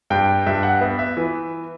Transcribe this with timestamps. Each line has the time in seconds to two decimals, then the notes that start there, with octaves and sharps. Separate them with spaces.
0.10 G2 G5
0.47 G2 E5
0.63 F#5
0.81 B3 E5
0.99 E5
1.17 E3